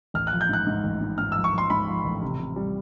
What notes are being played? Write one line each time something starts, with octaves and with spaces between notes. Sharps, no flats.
A1 F6
F#6
F3
G6
G#2 F#6
G#2
A1
G#2
G#2 F6
E6
F3
C#6
F3 C6
G#2 B5
F3
A1
C3
C3
G3